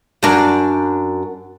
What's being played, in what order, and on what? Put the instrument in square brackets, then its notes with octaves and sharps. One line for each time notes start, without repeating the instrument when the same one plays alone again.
[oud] F#2 D4